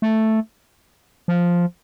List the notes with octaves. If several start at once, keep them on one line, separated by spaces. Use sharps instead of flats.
A3
F3